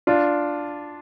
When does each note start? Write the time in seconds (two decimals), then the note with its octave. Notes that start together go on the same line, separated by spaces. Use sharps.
0.07 D4 F4